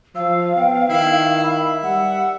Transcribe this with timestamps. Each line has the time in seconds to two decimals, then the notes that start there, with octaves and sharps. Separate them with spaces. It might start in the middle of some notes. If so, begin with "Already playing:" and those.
0.15 F3 F5 E6
0.57 B3 G5
0.89 D#3 E4
1.44 E5 B5
1.83 G3 F#5